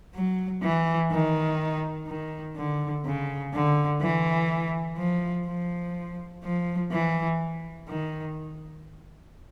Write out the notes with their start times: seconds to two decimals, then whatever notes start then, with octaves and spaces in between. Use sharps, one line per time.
0.14 F#3
0.63 E3
1.11 D#3
2.07 D#3
2.55 D3
3.05 C#3
3.53 D3
4.01 E3
4.98 F3
5.47 F3
6.44 F3
6.91 E3
7.88 D#3